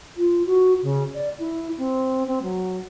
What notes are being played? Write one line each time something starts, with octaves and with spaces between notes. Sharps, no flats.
F4
F#4
C#3
D5
E4
C4
C4
F#3